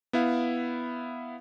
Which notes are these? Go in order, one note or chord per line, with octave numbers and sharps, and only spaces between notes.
B3 E4 F5